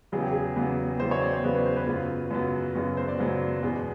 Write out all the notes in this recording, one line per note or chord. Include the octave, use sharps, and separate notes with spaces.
E2 C#3 F#3 B3 G#4
G4
G#4
E2 C#3 F#3 B3
E2 C#3 F#3 B3 C5
C#5
D5
C5
E2 C#3 F#3 B3 B4
B4
C5
B4
F#2 C#3 F#3 B3 F4
F#2 C#3 F#3 B3
F#2 C#3 F#3 B3 F#4
C5
D5
F#2 C#3 F#3 B3
E2 B2 G#3 B3